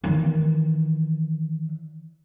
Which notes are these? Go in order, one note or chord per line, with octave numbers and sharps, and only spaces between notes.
D#3 E3